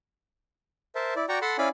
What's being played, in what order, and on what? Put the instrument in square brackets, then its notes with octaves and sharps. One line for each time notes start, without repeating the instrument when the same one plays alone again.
[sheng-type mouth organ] A#4 C5 E5 A5
E4 D5
F#4 D5 G5 A#5 C#6
A4 F#5 A5 B5 C6
C#4 E4 D5 F5 G#5 B5